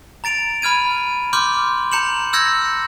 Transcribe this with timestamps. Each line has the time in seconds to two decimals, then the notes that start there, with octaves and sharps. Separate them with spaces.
0.24 A#5 A6 D7 F7
0.62 B5 F6 G#6 D#7
1.33 C6 D6 F6 G6
1.92 A#5 G6 C#7 E7 F#7
2.33 E6 F6 G6 G#6 A#6 C#7